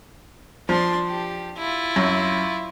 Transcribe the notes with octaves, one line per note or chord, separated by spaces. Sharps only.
F3 D4 C6
G4
E4 F4
F#2